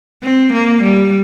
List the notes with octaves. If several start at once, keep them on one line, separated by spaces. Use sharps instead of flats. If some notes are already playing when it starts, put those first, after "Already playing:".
C4
A#3
G3